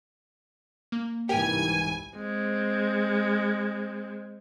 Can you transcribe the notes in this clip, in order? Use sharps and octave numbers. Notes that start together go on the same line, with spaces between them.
A#3
C2 G#2 E3 G4 A#4 G5 G#5
G#3 C4